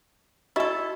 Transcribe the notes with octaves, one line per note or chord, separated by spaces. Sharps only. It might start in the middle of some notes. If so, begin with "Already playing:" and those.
E4 F#4 A4 D#5 C#6